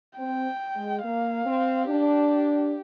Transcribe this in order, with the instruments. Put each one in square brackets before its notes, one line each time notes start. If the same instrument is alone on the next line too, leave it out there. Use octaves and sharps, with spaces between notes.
[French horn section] C4 [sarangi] G5
[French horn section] G#3
[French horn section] A#3 [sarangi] F5
[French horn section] C4
[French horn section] D4 [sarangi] G4